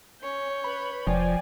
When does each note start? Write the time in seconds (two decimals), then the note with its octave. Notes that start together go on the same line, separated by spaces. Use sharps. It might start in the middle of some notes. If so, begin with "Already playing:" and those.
0.22 C#4 C#5 G6
0.64 B4 B5
1.07 F1 F3 D5 G5 G#5